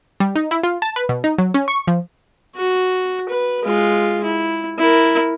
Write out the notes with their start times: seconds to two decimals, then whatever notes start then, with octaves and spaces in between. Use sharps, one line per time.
0.20 G3
0.36 D#4
0.51 E4
0.63 F4
0.82 A5
0.96 B4
1.09 B2
1.24 D#4
1.38 F#3
1.54 C#4
1.68 C#6
1.87 F3
2.56 F#4
3.29 B4
3.64 G#3 F4
4.23 E4
4.78 E4 A#4